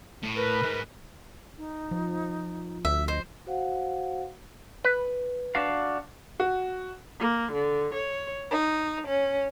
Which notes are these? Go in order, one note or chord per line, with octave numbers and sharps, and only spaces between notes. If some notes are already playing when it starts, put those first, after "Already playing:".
A2
A#4 B4
C#2 G#2
D#4
F3
D2 E5
C5 D#5
F#4 C5 F5 F#5
B4
D4 F#4 F5
F#4
A#3
D3
C#5
D#4
C#4